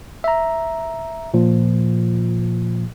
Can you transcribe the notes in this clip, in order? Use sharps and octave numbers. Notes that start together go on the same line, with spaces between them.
E5 A#5
A#2 F3